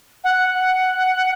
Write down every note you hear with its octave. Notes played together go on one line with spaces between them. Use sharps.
F#5
F#5